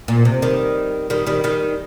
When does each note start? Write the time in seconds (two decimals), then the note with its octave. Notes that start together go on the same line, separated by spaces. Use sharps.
0.08 A#2
0.25 C3
0.42 D#3 G3
1.10 D#3 G3
1.26 D#3 G3
1.44 D#3 G3